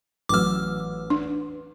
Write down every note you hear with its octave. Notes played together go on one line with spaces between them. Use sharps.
A1 F#3 B4 D6 E6 F6
D4